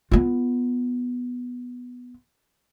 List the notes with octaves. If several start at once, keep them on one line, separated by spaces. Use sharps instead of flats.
B3 F4